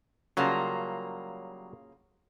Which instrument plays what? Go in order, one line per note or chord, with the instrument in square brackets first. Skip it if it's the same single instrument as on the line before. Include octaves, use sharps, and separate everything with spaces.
[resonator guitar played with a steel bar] C#3 A#3 F4 [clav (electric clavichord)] F#3 G3 A5